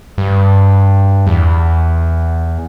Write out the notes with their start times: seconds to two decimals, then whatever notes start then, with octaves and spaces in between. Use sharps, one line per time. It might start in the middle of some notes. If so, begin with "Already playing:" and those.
0.18 G2
1.27 E2